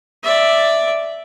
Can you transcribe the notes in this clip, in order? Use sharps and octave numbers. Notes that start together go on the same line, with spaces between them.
D5 E5